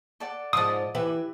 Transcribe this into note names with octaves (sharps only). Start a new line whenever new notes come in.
A4 D5 F#5
G#2 F3 D5 D#5 A5 D#6
E3 G4 B4 E5